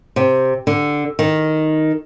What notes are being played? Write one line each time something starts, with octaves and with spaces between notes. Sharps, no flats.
C3
D3
D#3